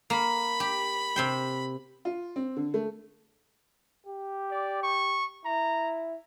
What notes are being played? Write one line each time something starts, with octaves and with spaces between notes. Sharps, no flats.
A#3 B5
G4
C3 C5 G5
F4
C4
D3
A3
G4
D5
C#6
E4 A#5